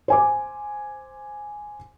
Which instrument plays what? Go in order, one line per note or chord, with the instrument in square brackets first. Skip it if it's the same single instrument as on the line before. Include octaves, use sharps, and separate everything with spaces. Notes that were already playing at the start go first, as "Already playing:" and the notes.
[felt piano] C5 G#5 D6